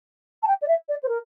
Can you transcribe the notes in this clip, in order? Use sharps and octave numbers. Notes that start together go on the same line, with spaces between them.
A5
G5
D5
E5
D5
C5
A#4